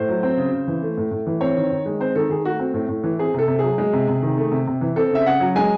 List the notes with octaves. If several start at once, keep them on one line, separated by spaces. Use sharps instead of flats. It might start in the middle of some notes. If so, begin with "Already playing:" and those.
Already playing: A2 C5
F#3
C4
C#3
C#3
E3
A3
A2
A2
E3
C4 C#5
D#3
D#3
G#3
C4 C5
D#3 A4
D#3 G#4
A3 F#4
C4
A2
A2
E3
C4 G#4
C3 A4
C3
F#3 G#4
G#3
C3
C3
D#3
A3
C3
C3
E3
C4 A4
C#3 E5
C#3 F#5
F#3
G#3 G#5